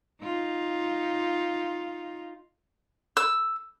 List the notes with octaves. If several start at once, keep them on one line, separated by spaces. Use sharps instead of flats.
D#4 F4
E6